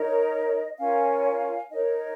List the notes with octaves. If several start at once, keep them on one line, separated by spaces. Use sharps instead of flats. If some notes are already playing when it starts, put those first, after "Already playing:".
Already playing: D#4 A#4 C#5 D#5
C#4 F4 A#4 C#5 F5 G#5
D#4 A#4 C#5 D#5